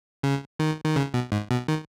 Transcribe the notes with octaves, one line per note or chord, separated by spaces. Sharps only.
C#3
D#3
D#3
C#3
B2
G#2
B2
D#3